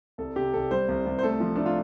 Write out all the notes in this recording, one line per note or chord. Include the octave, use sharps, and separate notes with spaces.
C2 A4
C3 G4
C2 A4
G3 C5
C2
C2
C5
A3 A4
F3
A3 D4
F4